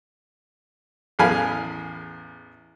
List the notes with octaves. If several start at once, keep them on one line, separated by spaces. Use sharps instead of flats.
A1 E2 G#4 F5 G#5 B5